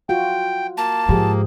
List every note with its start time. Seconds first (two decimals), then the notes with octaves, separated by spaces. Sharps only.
0.09 F4 F#4 G5
0.77 A#3 A5
1.09 G#2 F3 G4 G#4